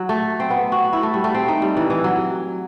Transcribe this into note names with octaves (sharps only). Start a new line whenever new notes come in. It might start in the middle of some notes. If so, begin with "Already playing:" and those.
Already playing: F#3
A3
C4
B3
F#4
E4
A3
G3
A3
C4
D#4
G3
E3
E3
F#3